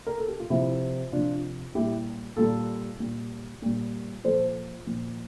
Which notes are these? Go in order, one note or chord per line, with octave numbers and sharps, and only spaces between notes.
A#4
A4
G4
F4
C3 F3 E4
C3 F3 D4 F4
A#2 G3 E4 G4
A#2 G3 F4 A4
A#2 G3
A#2 G3
A#2 F3 A4 C5
A#2 F3